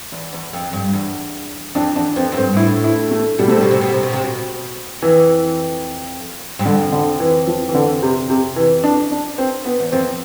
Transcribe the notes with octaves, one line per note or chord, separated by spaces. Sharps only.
E2
E2
F2
G2
E2
F2 D4
E2 D4
F2 C4
F2
G2 C4
B2
A2 E4
E4
A3
B2 G3
C3 A3
B2 G3
C3
B2
C3
B2
C3
B2
F2 E3
G2
F2 D3
D3
E3
F3
E3
D3
C3
C3
E3
D4
D4
C4
B3
E2
F2 C4